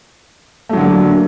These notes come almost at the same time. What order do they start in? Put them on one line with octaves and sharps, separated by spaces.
A3 F#3 D3 A#3